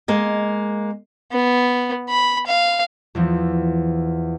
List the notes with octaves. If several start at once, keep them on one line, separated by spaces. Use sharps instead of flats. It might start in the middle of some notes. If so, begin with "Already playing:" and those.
G#3 A#3 D#5
B3
B5
F5
E2 E3 F3